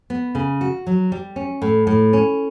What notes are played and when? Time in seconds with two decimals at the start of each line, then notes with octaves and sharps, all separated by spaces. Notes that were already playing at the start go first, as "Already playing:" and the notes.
0.10 B3
0.35 C#3
0.61 F#4
0.87 F#3
1.12 G3
1.36 C#4
1.62 A2
1.87 A2
2.13 C#4